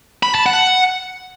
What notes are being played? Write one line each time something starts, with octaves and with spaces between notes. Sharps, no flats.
B5
A5
F#5